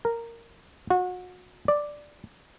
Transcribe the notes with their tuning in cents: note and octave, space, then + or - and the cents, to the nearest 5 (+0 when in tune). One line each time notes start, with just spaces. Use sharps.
A#4 -10
F#4 -30
D5 +5